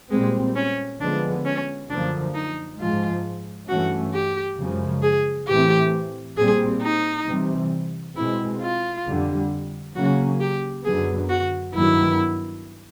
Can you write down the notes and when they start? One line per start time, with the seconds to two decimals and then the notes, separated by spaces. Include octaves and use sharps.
0.11 A#2 G3 G#3 C4
0.56 C#4
1.00 D3 F3 G#3 B3 D4
1.45 C#4
1.89 F#2 D3 F3 A#3 D4
2.34 D#4
2.79 G#2 F3 G#3 F4
3.69 G2 E3 A3 C#4 F#4
4.13 G4
4.58 F#2 C#3 F3 G#3
5.02 G#4
5.48 A2 E3 A3 C4 G4
6.37 A#2 G3 C4 G#4
6.82 D#4
7.27 C3 E3 G3 C4
8.16 B2 G#3 C4 E4
8.61 F4
9.06 F2 D3 G3
9.95 C#3 F#3 A#3 C#4 F#4
10.40 G4
10.85 F#2 D3 F#3 B3 G#4
11.29 F#4
11.74 G2 D#3 F#3 B3 E4